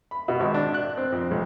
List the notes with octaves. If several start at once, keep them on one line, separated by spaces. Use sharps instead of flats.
B5
B2
G#1
D4
F#6
C4
F2
B1